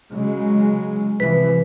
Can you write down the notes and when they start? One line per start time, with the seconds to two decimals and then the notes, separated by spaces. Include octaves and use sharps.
0.12 C#3 F#3 G#3
1.20 C2 E3 F3 B4